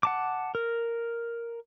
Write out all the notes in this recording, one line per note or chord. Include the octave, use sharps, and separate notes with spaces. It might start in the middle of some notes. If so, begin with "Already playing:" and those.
F#5 A5 D6
A#4